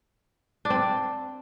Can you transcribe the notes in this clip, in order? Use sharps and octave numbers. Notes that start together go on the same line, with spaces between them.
D4
C4